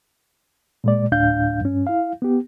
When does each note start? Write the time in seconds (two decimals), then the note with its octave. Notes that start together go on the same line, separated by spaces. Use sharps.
0.84 A#2 G#3 D5
1.12 D2 A2 D4 F5 G6
1.61 G2 C#4
1.87 E4 F5
2.22 B3 G4